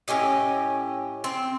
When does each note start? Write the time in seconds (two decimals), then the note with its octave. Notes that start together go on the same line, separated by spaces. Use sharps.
0.08 A2 C#4 G4 D#5
1.24 C4